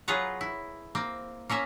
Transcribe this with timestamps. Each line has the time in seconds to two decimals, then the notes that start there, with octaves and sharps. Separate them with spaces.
0.08 F#3 F4 G#4 B4 C#5 A#5
0.41 E4
0.95 A#3 C4
1.49 A#3 C#4 A#4 E5